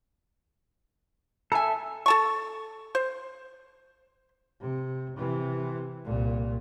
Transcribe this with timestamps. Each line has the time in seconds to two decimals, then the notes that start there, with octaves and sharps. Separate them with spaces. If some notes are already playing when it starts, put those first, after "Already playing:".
1.52 A4 E5 G#5 A#5
2.06 A4 A5 C#6
2.95 C5
4.61 C3
5.16 C3 E3
6.05 C2 A#2